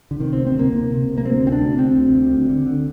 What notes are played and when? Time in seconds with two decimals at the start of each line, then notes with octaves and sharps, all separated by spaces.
0.11 D3
0.20 C3 D#3
0.33 D2 C4
0.47 C4
0.55 C3 A#3
0.72 C3
0.91 C3
1.08 C3
1.18 A#3
1.25 D2 C4
1.43 C3 C4
1.52 D4
1.61 D2
1.78 D2 C4
1.96 D2
2.14 D2
2.32 D2
2.49 D3
2.66 D3